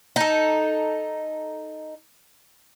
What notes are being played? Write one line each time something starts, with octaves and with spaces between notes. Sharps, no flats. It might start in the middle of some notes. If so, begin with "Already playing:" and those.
D#4 A4